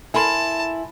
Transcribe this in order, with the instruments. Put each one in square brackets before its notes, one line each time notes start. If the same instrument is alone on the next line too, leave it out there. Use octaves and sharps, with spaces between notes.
[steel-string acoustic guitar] E4 [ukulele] A4 A#4 B5 [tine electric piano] G#5 C6 [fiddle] A5